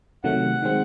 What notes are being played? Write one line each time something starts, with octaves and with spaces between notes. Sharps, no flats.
C3 D#3 F#3 A3 F#5
D#3 G#3 C4